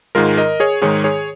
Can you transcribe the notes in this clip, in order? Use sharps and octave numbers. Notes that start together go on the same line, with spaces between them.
G#2 D#3 G#3 F4 A#4
A#4 D#5
G#4 C#5
G#2 D#3 G#3 G#4 C#5
G#4 C#5